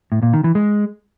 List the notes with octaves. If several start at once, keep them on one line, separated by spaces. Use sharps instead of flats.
A2
A#2
D#3
E3
G#3